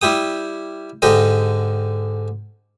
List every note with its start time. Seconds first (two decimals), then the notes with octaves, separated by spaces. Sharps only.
0.02 G3 E4 G4 D#6
1.02 G#2 D3 G4 D#5